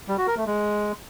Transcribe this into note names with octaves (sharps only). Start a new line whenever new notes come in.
G3
F#4
A#4
A3
G#3